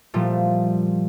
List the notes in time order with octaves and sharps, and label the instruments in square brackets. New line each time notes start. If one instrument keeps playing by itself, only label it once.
[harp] A#2 F3 G3 A3